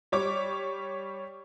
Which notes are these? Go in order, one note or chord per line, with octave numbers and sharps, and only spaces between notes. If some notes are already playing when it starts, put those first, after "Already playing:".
G3 C#5 D6